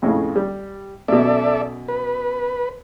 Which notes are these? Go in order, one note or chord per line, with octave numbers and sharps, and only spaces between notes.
F2 A2 C#3
G3
F#2 B2 A4 D5 E5
B4